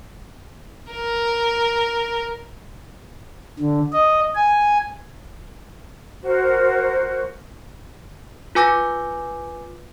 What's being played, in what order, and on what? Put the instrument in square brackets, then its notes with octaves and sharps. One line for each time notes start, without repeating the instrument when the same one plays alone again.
[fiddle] A#4
[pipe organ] D3
D#5
G#5
[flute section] F#4 A#4 C5
[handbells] F4 B4 G#5 D6 G6 A#6